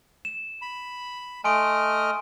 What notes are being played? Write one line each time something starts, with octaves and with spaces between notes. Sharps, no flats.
E7
B5
A3 D#5 G#5 C6 F6 D7